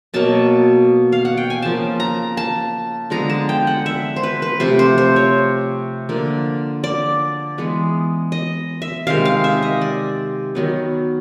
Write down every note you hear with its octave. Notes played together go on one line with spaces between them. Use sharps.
B2 F#3 A#3 A5
F5
F#5
G5
G#5
C#3 F3 A#3 A5
A#5
A5
D3 F3 G#3 B3 A#5
A5
G5
F#5
E5
C5
B4
B4
C3 F3 A3 C5
C5
C5
C#5
D3 F3 A#3
D5
E3 G#3 B3
D#5
E5
C3 D#3 G#3 F5
F5
E5
D#5
D5
D#3 F#3 B3